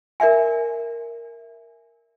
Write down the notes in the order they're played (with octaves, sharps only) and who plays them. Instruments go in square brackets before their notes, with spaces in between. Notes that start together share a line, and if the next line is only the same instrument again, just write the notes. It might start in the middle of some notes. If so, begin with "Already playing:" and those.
[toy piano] A#4 D5 E5 G#5